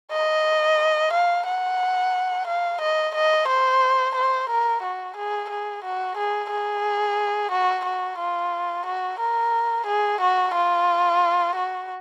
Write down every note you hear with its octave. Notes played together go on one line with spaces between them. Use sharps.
D#5
F5
F#5
F5
D#5
D#5
C5
C5
A#4
F#4
G#4
G#4
F#4
G#4
G#4
F#4
F#4
F4
F#4
A#4
G#4
F#4
F4
F#4